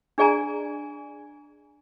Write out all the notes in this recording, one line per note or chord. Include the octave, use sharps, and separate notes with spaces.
D4 G#4 D5 G#5 A#5